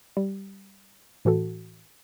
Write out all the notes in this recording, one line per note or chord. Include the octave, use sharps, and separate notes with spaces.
G3
A2 E3 F#4 A4